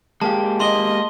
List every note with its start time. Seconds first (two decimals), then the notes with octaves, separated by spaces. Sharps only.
0.21 G#3 A#3 G4 A5
0.60 D#5 C6 G7